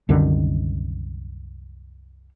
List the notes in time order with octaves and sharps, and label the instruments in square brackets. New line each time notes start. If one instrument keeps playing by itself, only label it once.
[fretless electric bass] C2 F#2 D3 D#3